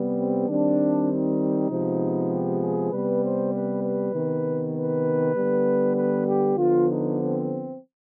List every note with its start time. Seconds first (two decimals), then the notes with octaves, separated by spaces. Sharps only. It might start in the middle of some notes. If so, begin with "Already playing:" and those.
Already playing: C3 G3 B3
0.16 C4
0.47 D#3 G3 C4 D4
1.08 D#4
1.69 C3 F3 G#3 B3
2.30 G4
2.61 G#4
2.90 C3 G3 B3 B4
3.22 C5
3.52 B4
3.82 B4
4.13 C3 D#3 B3
4.74 B4
5.34 D3 G3 B3
5.95 B4
6.26 G4
6.57 D3 F3 B3 F4
6.87 D#4
7.18 C4